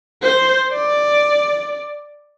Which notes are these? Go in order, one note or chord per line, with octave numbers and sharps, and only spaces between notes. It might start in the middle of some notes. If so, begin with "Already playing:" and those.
C5
D5